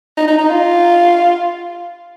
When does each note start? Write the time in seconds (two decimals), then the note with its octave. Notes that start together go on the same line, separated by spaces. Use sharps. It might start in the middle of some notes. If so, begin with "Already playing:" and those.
0.17 D#4
0.27 D#4
0.38 D#4
0.50 F4